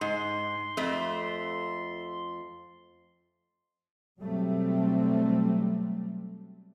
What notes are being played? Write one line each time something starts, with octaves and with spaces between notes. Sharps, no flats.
G#2 C6
F2 A3
B2 F#3 G3 A3 C4